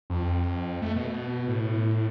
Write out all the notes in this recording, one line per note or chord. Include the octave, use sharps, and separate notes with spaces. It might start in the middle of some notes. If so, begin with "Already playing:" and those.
F2
A3
B2
A2